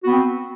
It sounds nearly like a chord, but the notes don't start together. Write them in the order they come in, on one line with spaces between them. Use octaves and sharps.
F#4 B3 C4